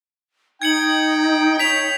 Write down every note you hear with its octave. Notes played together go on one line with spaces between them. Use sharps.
D#4 G5 G#6 C#7 F#7
C#5 B6 F7